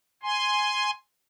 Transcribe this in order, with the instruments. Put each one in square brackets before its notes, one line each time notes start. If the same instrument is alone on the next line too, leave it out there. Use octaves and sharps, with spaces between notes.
[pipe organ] G#5 C6